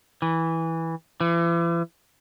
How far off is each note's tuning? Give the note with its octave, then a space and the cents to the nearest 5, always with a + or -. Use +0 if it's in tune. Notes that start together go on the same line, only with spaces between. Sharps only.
E3 -10
E3 +40